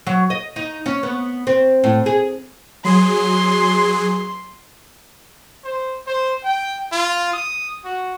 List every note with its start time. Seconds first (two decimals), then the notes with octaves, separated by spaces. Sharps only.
0.07 F#3
0.30 D#5
0.56 D#4
0.86 C#4
1.03 B3
1.47 C4
1.84 A2
2.06 G#4
2.84 F#3 G#4 C6
5.64 C5
6.07 C5
6.44 G5
6.92 F4
7.33 D#6
7.85 F#4